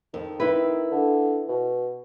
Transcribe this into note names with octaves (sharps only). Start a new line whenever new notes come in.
F2 D#3
C4 E4 B4
D3
B2